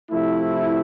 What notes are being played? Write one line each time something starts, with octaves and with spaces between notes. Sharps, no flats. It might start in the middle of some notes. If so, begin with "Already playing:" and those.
C3 F3 A3 E4